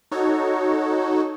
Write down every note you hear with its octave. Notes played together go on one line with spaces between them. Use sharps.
D#4 F#4 A4 C#5